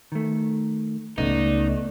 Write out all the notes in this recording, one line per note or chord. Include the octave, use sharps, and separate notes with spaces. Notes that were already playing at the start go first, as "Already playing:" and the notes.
D#3 A3
C#2 C#3 A3 B3 D#4 D5